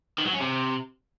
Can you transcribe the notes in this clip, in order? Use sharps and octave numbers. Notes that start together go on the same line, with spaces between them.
D#3
F#3
C#4
C3